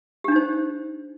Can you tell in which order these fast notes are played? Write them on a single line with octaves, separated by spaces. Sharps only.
G4 D4 D#4 C5